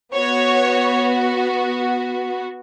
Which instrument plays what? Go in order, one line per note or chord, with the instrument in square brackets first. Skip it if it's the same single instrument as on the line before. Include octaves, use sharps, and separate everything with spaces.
[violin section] B3 F#4 C#5